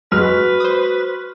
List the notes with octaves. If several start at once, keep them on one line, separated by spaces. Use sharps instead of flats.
F#3 G#3 F#4 B4 C6 C#6 F6
C5 D#6